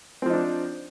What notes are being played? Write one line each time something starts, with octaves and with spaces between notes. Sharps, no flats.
F3 C4 D4 D#4